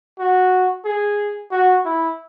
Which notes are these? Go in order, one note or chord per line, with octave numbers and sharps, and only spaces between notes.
F#4
G#4
F#4
E4